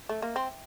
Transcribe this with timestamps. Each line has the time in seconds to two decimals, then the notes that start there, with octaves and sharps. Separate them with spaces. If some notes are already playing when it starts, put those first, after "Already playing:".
0.09 A3
0.22 A#3
0.36 C4